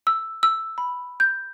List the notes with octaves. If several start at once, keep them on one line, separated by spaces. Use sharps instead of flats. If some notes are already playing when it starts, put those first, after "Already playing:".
E6
E6
B5
G6